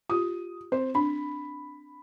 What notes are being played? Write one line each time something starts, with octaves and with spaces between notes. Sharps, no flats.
F4 G4 D#6
C4 C5
D4 B5